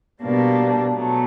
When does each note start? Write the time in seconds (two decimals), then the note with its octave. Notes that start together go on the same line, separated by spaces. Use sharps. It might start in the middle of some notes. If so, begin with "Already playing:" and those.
0.22 B2 G3 A#3 D4
0.92 B2 F#3 A3